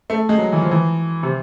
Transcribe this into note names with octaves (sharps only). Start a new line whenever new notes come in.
A3
G#3
F#3
E3
F3
E3
C3